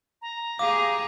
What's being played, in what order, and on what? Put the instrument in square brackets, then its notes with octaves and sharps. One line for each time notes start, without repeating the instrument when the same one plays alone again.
[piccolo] A#5
[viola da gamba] G4 G#4 [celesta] F5 [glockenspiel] D6